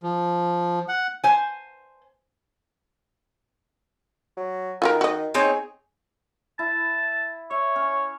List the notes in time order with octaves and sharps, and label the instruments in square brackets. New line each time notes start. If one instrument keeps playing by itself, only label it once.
[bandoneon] F3
F#5
[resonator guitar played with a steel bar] C5 G#5
[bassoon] F#3
[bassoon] D#3 [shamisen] F4 F#4 A#4
[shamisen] F#4 D#5
[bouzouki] C4 D#4 C#5 [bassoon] G#4
[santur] E4 [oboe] A5
[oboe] C#5 [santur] E5
[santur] C#4